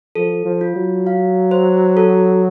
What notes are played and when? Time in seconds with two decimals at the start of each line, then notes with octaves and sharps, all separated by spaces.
0.15 F3 A4
0.45 F3
0.61 F4
0.76 F#3
1.07 F5
1.51 C5
1.97 A4